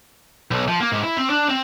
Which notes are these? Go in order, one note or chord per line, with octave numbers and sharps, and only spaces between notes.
B1
F3
A#3
G#2
E4
C4
D4
C4